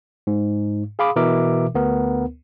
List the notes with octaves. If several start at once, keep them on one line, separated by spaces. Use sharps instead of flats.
G#2
G#4 F5 B5 D6 D#6
B2 E3 A#4 E5 D6
D2 B3 A#4